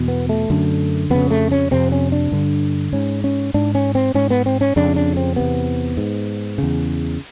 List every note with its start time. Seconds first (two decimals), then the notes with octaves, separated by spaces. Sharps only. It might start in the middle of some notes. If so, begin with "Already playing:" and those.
Already playing: E2 B2
0.08 B3
0.29 A3
0.50 F#2 D3
1.10 F2 C#3 B3
1.30 A3
1.52 C#4
1.71 F2 C3 C4
1.92 C#4
2.12 D4
2.32 G2 D3
2.93 G#2 C#4
3.24 C#4
3.54 G#2 D4
3.75 C#4
3.95 C4
4.14 G#2 C#4
4.30 B3
4.46 C4
4.61 C#4
4.76 F2 C#3 D4
4.96 D4
5.17 C4
5.36 E2 C3 B3
5.97 G#2
6.58 E2 C#3